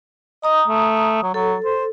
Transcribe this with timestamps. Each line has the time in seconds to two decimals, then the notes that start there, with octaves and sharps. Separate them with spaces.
0.44 D#5 A#5 D#6
0.68 A3
1.23 F#3
1.34 F#3 A4
1.65 C5